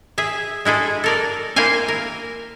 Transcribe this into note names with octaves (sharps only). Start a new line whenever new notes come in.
G#4 E5
G#3 E4 G#4 A4
A4 A#4 D5
A#3 E4 C5 F5 G#5
A#4